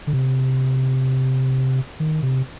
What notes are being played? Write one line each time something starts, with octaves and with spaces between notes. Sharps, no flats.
D3
C3
D#3
C3